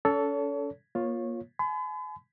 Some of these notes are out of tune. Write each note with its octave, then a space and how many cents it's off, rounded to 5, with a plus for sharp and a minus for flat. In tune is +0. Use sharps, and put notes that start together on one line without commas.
C#4 +35 A4 +0 C#5 +40
A#3 +30 F4 +10 C#5 -15
G#5 +40 B5 +40